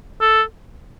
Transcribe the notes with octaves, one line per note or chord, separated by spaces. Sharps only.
A4